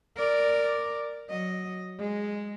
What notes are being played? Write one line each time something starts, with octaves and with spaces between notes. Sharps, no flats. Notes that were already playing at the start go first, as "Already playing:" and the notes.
A#4 D5
F#3 D#5
G#3